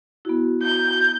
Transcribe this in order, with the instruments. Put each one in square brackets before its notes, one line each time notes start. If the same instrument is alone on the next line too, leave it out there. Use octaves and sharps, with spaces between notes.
[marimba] B3 E4 [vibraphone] F#4
[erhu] G6